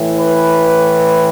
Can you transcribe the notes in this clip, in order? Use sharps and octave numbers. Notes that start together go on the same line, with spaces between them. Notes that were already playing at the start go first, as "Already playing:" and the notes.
Already playing: A2 E3
B4